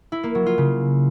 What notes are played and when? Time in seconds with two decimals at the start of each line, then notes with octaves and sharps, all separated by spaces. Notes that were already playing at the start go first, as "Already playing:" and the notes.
0.12 E4
0.23 A#3
0.35 F#3
0.46 F4
0.58 C#3